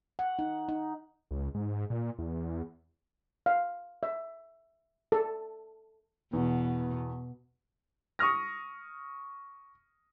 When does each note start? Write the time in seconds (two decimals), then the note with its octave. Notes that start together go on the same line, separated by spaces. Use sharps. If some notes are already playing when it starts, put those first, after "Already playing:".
0.19 F#5
0.39 D#4
0.69 D#4
1.31 C#2
1.55 G#2
1.90 A#2
2.19 E2
3.46 F5
4.03 E5
5.12 A4
6.33 E2 B2
8.19 C#6 D#6 F6 A#6